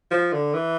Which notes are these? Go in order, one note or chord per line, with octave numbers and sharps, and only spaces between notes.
F3
D3
E3